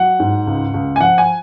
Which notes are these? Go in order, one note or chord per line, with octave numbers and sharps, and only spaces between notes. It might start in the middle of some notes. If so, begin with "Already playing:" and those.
Already playing: F#3 F#5
G#2
C#2
C#2
G#5
F3 F#5
G#5